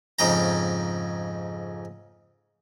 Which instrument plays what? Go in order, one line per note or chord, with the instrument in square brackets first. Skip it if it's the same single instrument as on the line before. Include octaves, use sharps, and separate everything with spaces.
[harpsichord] F2 G#2 C#3 G5 A#5